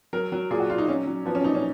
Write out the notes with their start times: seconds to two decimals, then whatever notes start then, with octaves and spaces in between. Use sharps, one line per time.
0.13 F#3 A#4
0.32 F#3
0.51 A#2 G#4
0.60 F#4
0.70 A#2 F4
0.78 D#4
0.88 F#3 C#4
1.07 F#3
1.25 F3 B3
1.35 C#4
1.44 A#2 D#4
1.55 C#4